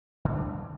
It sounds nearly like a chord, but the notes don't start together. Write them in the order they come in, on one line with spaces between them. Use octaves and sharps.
D3 F3 G3 D4